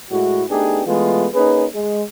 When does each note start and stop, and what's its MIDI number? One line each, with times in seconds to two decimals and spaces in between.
0.11 0.43 45
0.11 0.43 56
0.11 0.43 64
0.11 0.43 66
0.50 0.81 57
0.50 0.81 59
0.50 0.81 62
0.50 0.81 63
0.50 0.81 67
0.50 0.81 68
0.86 1.27 52
0.86 1.27 56
0.86 1.27 57
0.86 1.27 59
0.86 1.27 65
1.34 1.65 58
1.34 1.65 61
1.34 1.65 63
1.34 1.65 68
1.34 1.65 71
1.74 2.03 56